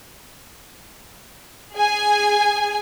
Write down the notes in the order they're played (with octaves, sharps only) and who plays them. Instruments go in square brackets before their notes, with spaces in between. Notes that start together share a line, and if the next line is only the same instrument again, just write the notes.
[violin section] G#4 G#5